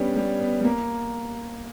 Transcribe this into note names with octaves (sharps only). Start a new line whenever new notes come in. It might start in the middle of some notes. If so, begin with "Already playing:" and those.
Already playing: G3 B3 C#4 D4
G3
B3
G3
A#3